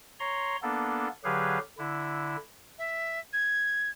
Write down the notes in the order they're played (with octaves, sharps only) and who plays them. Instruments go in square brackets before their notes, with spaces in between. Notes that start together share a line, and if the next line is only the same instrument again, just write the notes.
[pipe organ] C#5 A#5 C6
A#3 B3 D4 A4
D3 F#3 G4 G#4 B4 F5
D3 E4
[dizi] E5
G#6